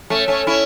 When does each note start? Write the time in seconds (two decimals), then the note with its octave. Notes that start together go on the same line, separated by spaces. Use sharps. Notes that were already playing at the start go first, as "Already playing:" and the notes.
0.10 A3 C#4
0.28 A3 C#4
0.47 C#4 E4